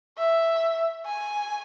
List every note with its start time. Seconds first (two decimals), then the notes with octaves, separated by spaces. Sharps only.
0.18 E5
1.06 G#5